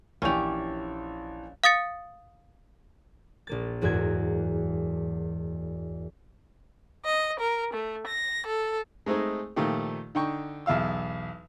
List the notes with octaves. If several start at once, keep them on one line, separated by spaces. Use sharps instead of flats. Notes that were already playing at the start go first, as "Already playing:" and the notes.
A#1 E3 C#4 G4 F7
F5 D#6 A6 C#7
A#1 A#3 A6
F#1 E2 G#2 F#4 A#4 G#6
D#5
A#4
A3
A#6
A4
G#3 A3 C4 D#4 G#4
A#2 D#3 F3 A3 D#4 G4
D3 D4 D#4 G5 C#6
B1 E2 E5 F5 E6